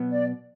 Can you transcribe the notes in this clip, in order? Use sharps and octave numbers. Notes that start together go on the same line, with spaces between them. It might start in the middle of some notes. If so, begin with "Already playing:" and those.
Already playing: B2 F#3 B3
D5